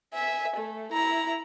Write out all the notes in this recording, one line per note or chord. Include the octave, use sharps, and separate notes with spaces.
E5 G#5
A3
E4 A#5